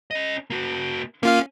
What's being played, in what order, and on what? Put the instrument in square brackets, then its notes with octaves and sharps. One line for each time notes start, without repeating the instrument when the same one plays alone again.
[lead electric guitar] C#4 D#5
A#3 F#4
[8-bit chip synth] A#3 F4 F5 [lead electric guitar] C#4